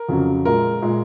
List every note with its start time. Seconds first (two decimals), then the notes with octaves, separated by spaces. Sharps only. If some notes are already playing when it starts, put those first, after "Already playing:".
Already playing: A#4
0.09 F2 C#3 F#3
0.45 A#2 G#3 A#4
0.82 A#2 G#3